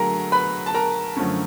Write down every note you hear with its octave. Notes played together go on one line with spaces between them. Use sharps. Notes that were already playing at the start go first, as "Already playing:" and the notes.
Already playing: D3 F#3 A3 G#4 A#4 A#5
B4 B5
A5
A#4 A#5
F#2 D3 F3 A3 C#4